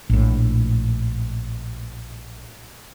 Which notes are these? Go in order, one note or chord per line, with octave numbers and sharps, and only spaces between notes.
A#1 A2